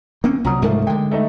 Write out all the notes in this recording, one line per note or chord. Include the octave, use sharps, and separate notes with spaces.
A#3 C4 C#4
C2 F#3 F#4 A#5 D#6
C2 G#2 F3 A3 A#3
D3 G#3 G5
A3 D#4 D#5